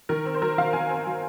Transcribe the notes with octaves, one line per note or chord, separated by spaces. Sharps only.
D#3 A#4
C4
C5
F#3 A#4
D#3 F5
D#3 G#5
C4
F#3